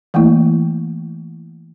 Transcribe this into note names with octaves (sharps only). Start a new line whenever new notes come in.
E3 A3 A#3 E4